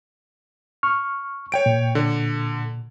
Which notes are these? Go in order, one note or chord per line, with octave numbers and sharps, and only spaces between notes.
C#6 F6
C#5 G5 D7
A#2
D3